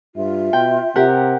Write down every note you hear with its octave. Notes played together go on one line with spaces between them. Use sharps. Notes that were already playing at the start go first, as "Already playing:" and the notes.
G2 F4 E5
B2 G5
C3 G4 A#4 F#5